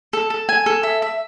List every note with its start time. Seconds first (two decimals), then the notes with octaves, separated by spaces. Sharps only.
0.13 A4
0.30 A4
0.49 G#5
0.66 A4
0.83 E5
1.02 E5